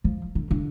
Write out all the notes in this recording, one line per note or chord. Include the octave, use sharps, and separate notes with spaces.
F3
D3
D3